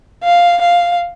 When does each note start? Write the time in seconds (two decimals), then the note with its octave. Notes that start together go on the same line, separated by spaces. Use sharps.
0.24 F5
0.61 F5